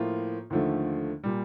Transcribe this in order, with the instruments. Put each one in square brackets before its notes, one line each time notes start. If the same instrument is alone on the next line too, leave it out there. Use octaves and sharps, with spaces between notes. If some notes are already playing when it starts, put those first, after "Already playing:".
Already playing: [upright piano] A2 F3 A#3 F4
D#2 D3 F3 A3
A#2 G3